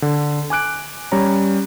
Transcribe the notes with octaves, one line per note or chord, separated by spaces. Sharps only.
D3
G#5 D6 F#6 D7
G3 C#4 C#5 A#5